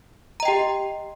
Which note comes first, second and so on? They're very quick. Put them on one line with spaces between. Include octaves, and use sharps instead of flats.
A#5 D#5 G5 G4